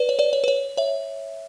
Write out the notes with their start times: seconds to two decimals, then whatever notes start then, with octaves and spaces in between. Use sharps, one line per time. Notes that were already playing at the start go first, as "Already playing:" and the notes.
Already playing: B4 D5
0.09 C#5
0.19 B4 D5
0.33 C#5
0.44 B4
0.48 C#5
0.77 C#5 E5